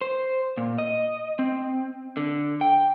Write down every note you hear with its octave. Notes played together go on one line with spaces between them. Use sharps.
C5
A#2
D#5
C4
D3
G5